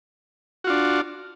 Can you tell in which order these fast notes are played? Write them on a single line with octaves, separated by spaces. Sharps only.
F#4 F4 D4